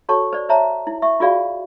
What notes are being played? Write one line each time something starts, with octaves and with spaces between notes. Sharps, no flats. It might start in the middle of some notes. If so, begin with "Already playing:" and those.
F#4 A4 C#5 A5 C#6
C5 D5
C5 C#5 E5 A5 A#5
E4
E5 C#6
F4 F#4 G#4 D5 F5